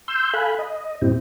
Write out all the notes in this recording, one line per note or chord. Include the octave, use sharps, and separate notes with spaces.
C6 E6 G6
A4 F5 G#5 B5 F#6
D#5
G2 A#2 C4 E4 G4